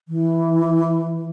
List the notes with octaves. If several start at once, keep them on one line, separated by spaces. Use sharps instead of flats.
E3